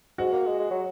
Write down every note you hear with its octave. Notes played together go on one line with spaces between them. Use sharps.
G#2 F#4
A#3
G#3
G#3
F#3